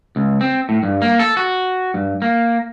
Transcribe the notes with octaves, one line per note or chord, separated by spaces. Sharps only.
C#2
C4
A2
G2
A#3
A4
F#4
G2
A#3